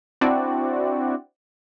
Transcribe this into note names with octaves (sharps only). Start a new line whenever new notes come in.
C4 D4 E4 F#4 D5 G5